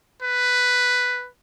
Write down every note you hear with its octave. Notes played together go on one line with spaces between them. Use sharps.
B4